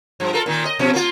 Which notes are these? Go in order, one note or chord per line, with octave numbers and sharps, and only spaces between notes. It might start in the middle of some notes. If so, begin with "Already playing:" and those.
G2 F3
F4 A4 A#4
A#2 D#3
D#5
B2 F3 C#4
A#3 F4